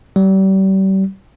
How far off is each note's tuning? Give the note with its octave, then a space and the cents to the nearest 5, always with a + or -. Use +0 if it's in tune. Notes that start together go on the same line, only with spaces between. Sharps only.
G3 -35